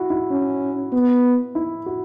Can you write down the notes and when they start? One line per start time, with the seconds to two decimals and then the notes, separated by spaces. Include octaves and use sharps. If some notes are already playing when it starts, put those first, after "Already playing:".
Already playing: E4 F#4
0.10 E4
0.31 C#4
0.93 B3
1.55 E4
1.86 F#4